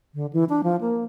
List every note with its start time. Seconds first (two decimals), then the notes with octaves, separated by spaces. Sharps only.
0.15 D3
0.33 E3
0.49 D4
0.64 F3
0.81 A#3